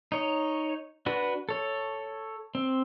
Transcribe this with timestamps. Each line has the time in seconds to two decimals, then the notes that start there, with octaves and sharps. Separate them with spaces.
0.12 D#4 C#5
1.06 D4 F#4 B4
1.49 A4 C#5
2.55 C4